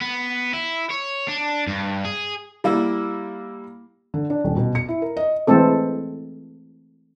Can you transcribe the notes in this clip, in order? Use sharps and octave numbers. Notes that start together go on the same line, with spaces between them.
B3
E4
C#5
D4
G2
G#4
G3 A#3 E4
D3
D4
D#1
B2
C#7
E4
A#4
D#5
E3 G#3 A3 C4 A4